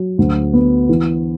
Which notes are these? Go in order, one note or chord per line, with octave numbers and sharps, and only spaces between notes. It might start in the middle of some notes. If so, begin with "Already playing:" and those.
Already playing: F#3
D2
B3
E3